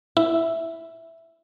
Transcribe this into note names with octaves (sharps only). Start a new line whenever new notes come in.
E4 E5